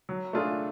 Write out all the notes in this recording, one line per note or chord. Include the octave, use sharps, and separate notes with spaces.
F#3
A3 D4 F4 G#4